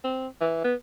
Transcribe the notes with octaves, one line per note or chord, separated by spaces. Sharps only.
C4
E3
B3